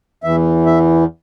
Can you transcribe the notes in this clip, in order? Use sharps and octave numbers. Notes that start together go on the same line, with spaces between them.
E2 E3 E5
E5